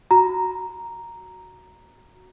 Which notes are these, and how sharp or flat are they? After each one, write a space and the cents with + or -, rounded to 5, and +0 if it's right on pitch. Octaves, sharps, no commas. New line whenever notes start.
F#4 +0 A#5 +0